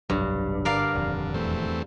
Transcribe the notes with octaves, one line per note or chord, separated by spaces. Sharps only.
F1 B1 G2 F#3
G1 D3 A#4 D5 F5
D#1 F2
E2 A3 C4